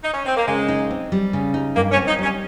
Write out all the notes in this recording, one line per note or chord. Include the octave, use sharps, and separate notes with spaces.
D#4
C#4
C4
A#3
C#3 G#3
D#4
C4
G3
C#3
D#4
G2 A#3
C#4
C4
D#4
G3 C#4